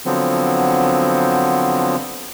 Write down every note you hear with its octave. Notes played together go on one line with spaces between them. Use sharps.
D3 F3 F#3 B3 C4